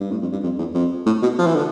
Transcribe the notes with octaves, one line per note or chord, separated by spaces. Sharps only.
G2
A2
F2
G2
F2
E2
F2
A2
B2
F3
E3
D3